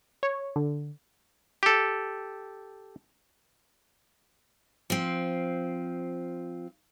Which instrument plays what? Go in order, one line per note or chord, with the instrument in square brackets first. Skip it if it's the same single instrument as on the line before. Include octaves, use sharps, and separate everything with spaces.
[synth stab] C#5
D3
[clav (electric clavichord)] G4 A4
[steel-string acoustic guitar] F3 C4